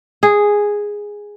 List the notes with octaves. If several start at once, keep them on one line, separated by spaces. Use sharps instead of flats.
G#4